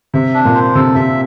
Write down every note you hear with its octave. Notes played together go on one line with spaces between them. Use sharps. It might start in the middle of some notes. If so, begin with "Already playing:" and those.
C3 E5
D4
A#2
C5
C3 A4
C3 E5